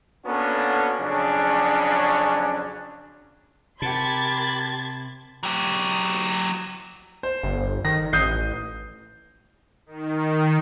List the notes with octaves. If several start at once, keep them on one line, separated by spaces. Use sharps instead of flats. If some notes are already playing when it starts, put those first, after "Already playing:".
A#3 B3 C#4 D4 F#4 A4
F2 C#3 F#3 C#4 D4
C3 G4 A#4 A5 B5 C6 G#6 A6
F#3 G4
C5
G1
D#3 A#6
A1 D#6 G6 C7
D#3